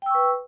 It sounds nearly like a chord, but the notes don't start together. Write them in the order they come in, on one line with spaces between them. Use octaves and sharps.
G5 E6 C#6 B4